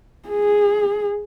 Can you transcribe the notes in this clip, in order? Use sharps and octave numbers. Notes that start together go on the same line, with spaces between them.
G#4